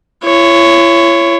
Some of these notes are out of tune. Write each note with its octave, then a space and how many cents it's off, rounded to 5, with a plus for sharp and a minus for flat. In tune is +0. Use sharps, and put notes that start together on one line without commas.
E4 +45 C#5 +0